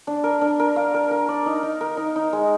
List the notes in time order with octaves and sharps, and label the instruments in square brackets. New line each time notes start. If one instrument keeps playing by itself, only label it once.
[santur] D4
A#4
D4
A#4
F5
A#4
A#4
D5
D#4
D#4
A#4
D#4
D#4
G#3